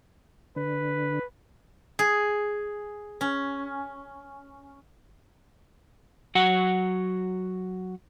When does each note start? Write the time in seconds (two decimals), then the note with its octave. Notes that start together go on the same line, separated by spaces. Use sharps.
0.56 D3 B4
1.99 G#4
3.21 C#4
6.35 F#3 F#4 F#5